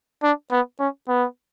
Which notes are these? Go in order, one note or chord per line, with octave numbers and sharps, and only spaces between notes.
D4
B3
C#4
B3